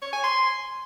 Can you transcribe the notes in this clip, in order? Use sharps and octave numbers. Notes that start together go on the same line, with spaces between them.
C#5
G#5
C6